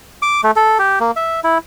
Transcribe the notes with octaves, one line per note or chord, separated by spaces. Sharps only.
D6
A3
A4
G4
A#3
E5
E4